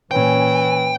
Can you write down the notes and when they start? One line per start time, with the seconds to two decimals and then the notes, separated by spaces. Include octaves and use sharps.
0.11 A#2 E3 C#4 G5